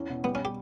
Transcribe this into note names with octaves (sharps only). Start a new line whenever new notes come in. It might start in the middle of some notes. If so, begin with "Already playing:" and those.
Already playing: E2 C#4
B2
G3 B3
C#4
G4